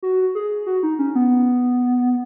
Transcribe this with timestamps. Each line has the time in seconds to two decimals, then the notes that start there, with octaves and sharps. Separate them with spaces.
0.03 F#4
0.35 G#4
0.67 F#4
0.83 D#4
0.99 C#4
1.15 B3